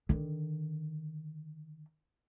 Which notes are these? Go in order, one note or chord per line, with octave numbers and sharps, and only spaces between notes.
D3 D#3